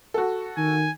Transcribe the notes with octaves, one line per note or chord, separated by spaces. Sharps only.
F#4 A4
D#3 G#5